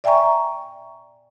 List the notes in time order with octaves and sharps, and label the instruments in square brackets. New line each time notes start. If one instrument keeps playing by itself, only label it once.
[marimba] D5 E5 G5 G#5 A#5 C#6